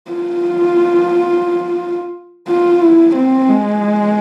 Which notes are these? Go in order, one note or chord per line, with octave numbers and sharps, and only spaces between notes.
F4
F4
E4
C4
G#3